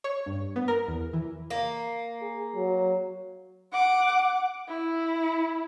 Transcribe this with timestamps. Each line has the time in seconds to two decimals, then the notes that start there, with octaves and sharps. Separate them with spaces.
0.04 C#5
0.26 G2
0.56 B3
0.68 A#4
0.87 E2
1.13 E3
1.50 A#3
2.22 G#4
2.55 F#3
3.72 F#5 D6
4.68 E4